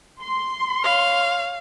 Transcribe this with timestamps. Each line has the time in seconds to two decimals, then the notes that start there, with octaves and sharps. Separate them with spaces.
0.21 C6
0.84 C#5 F5 F6